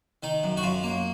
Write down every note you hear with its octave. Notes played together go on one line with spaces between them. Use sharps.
D#3 D#4
F#2
F#4
F#2 F4
A#3